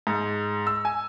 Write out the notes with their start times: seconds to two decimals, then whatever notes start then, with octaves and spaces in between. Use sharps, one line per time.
0.07 G#2
0.67 E6
0.85 G#5